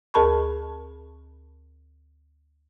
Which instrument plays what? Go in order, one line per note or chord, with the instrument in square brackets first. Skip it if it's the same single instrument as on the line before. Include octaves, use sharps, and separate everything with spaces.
[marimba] D2 G#4 A#4 A5 B5 C#6